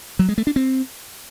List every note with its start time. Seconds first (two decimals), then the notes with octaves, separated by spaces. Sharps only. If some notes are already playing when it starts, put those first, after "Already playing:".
0.19 F#3
0.29 G#3
0.38 A3
0.47 D4
0.56 C4